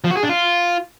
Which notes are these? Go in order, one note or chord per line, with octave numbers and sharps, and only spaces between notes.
F3
F#4
G#4
D4
F4